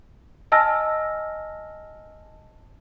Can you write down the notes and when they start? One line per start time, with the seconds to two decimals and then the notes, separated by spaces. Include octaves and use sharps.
0.52 D#5 G#5 A5 E6 F6 A#6